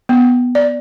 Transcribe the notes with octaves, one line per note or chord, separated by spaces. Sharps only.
B3
D5